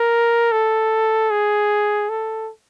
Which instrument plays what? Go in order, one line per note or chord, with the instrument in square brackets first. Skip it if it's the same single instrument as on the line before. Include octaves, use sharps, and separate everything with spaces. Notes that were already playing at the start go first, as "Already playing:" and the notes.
Already playing: [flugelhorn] A#4
A4
G#4
A4